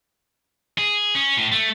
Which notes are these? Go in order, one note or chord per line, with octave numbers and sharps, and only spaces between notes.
G#4
C#4
A2
A3